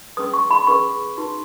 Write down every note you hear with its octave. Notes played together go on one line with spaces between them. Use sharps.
C#4 G#4 B4 D#6
C#6
B5
C#4 G#4 B4 C#6
D#4 F#4 B4